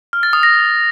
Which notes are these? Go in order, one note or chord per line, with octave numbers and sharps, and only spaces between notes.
F6
A6
D#6
A#6